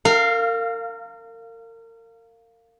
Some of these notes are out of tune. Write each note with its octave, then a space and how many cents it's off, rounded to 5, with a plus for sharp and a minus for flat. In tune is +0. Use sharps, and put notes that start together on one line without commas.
A#4 -35 F5 +0